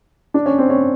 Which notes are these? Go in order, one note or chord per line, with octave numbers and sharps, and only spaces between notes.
D4
C#4
C4
C#4